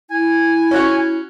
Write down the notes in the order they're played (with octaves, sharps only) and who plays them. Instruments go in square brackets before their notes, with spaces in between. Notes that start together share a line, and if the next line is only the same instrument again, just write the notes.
[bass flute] E4 [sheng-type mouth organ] G#5
[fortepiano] C#4 F#4 C#5